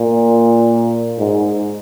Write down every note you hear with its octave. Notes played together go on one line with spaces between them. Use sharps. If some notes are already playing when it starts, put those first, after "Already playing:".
Already playing: A#2
G#2